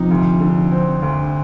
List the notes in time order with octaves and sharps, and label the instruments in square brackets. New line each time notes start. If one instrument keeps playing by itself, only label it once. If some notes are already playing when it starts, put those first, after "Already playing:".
Already playing: [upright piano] C3 D#4 [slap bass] F3
[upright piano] D2
D3
C4
D2